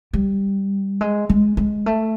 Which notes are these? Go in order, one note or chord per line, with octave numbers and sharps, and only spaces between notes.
G3
G#3
G#3
G#3
A3